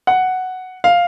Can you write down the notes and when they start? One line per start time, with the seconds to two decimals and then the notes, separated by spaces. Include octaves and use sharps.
0.07 F#5
0.84 F5